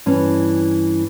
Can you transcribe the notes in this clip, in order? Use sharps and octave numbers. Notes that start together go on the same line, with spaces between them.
G2 E3 C#4